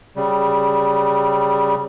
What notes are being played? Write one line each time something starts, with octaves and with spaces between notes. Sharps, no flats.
C#3 G3